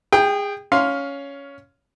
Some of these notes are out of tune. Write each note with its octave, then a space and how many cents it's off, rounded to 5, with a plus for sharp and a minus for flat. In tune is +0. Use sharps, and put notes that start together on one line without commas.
G#4 -25 G5 +5
C#4 +10 F5 +10 C6 +0